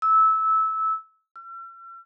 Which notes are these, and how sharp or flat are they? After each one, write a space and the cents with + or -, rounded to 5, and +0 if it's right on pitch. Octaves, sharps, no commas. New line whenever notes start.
E6 -20
E6 +45